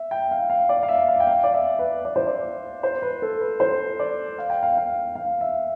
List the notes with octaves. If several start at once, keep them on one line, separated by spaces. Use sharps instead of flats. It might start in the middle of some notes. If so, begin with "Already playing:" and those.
Already playing: E5
G5
F5
F5
D5
F5
E5
F5
G5
F5
D5
E5
B4
D5
C5
D5
C5
B4
A4
B4
C5
D5
F5
G5
F5
F5
F5
E5